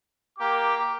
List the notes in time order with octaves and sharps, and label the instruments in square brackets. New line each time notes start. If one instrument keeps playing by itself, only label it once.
[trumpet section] A#3 D6 [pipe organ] G4